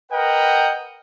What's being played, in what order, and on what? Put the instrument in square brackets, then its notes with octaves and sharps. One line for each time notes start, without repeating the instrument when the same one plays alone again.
[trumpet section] A#4 B4 D#5 F#5 G5